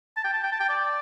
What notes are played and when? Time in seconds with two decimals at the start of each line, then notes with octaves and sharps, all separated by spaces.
0.17 A5
0.24 G5
0.33 A5
0.44 G5
0.52 A5
0.60 G5
0.69 D5